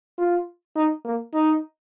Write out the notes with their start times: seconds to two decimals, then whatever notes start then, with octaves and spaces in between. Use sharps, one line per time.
0.18 F4
0.76 D#4
1.05 A#3
1.34 D#4